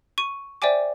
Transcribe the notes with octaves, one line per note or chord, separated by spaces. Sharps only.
C#6 D#7
C5 D5 E5 G5 G#5 D6